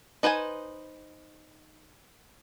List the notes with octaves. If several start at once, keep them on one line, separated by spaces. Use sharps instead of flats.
D#4 B4 C5 F#5 G#5